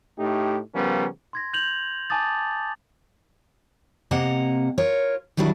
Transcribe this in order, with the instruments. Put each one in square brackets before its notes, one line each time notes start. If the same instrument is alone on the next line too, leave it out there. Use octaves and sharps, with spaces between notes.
[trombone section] A2 A3 D#4 G4
C#3 F3 G3 B3 C#4 A#4
[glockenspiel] C6 G#6 A#6
G6 F7 F#7
G#5 A5 D6 D#6 A6
[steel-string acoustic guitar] C3 A#3 C4 D#5 F#5 A#5
F4 A#4 C#5
D#3 F#3 G3 D4 E4